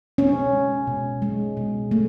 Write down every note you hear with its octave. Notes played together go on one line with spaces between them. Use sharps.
B2 C#4
G#3
B2
G#3
B2
A3